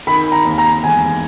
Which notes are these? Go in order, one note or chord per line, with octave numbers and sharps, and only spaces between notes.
D#3 B5
A#5
D#2
A#5
E1 G#5